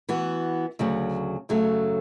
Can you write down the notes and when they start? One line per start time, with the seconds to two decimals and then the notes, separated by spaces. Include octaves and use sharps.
0.09 E3 B3 F#4
0.79 D2 C#3 F#3
1.49 F#2 C#3 F#3 A3